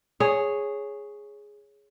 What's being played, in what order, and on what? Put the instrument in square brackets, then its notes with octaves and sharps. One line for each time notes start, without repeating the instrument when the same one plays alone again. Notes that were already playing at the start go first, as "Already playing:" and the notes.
[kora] G#4 C#5